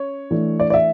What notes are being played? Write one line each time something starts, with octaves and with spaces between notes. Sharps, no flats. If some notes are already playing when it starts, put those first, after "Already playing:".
Already playing: C#4 C#5
E3 A3 D4
D5
D5
E5